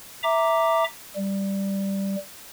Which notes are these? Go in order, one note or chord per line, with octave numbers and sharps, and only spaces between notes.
E5 A#5 D6
G3